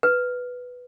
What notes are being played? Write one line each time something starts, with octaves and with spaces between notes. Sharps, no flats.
B4